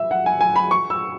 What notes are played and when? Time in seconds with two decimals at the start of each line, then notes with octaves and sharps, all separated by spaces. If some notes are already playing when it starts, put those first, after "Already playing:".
Already playing: E5
0.11 F#5
0.26 G#5
0.41 G#5
0.56 B5
0.71 C#6
0.90 E6